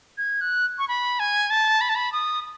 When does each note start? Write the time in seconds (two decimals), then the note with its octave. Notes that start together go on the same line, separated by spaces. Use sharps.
0.18 G#6
0.41 F#6
0.78 C#6
0.88 B5
1.19 G#5
1.50 A5
1.81 B5
1.89 A5
1.95 B5
2.12 D#6